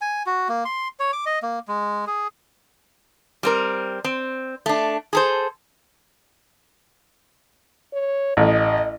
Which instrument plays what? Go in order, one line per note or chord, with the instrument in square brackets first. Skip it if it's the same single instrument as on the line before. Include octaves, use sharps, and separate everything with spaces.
[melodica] G#5
F#4
A#3
C6
C#5
D6
D#5
A#3
G#3
G#4
[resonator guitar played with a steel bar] G3 C4 A#4
C4
A3 D4
G#4 A4 C5
[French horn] C#5
[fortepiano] A1 [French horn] D#5